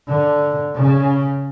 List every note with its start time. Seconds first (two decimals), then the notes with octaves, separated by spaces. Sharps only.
0.08 D3
0.77 C#3